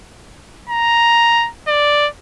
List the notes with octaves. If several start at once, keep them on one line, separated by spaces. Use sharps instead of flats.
A#5
D5